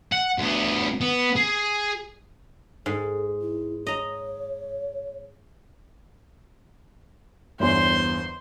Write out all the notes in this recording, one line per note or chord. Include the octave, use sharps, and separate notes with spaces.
F#5
D2 B3
B3
G#4
G#2 A4
E4
C#5 D#5 A#5
G1 E2 C5 C6